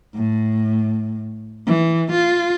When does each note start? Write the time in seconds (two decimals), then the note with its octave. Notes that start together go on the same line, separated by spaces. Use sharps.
0.15 A2
1.66 E3
2.12 F4